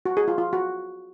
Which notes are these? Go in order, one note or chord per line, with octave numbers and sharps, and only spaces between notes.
F#4
G#4
F4
F4
F#4